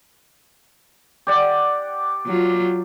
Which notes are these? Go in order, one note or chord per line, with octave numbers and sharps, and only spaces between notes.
G4 D5 F#5
F#3 F4